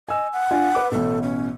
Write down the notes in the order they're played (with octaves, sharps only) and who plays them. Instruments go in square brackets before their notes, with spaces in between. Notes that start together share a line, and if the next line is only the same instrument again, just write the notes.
[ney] D#5 [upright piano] G#5 E6
[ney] F#5
[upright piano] D4 F4 G#5
B4 D6
[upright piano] A1 B2 [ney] A4
[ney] C#4